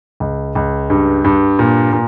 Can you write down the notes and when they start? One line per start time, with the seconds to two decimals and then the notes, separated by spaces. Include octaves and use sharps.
0.20 C#2
0.55 C#2
0.90 G2
1.24 G2
1.59 A#2
1.93 A#2